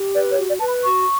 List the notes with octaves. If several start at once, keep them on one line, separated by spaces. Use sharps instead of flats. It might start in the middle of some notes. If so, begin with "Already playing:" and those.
Already playing: G4
B4 D5
C#5
F#4
D5
B4 A5
B5
F#4 C#6